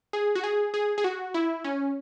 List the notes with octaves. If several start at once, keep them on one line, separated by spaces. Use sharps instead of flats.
G#4
F#4
G#4
G#4
G#4
F#4
E4
C#4